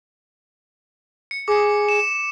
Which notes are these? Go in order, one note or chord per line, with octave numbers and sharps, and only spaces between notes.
C#7
G#4 D6 C#7
E7